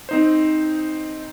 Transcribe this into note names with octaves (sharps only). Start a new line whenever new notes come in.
C4 D#4 C5